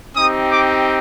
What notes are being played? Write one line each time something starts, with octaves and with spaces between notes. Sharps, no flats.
C4 D#4 G4 D#6
D6